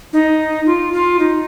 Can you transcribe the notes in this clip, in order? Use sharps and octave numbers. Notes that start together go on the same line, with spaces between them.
D#4
F4
F4
D#4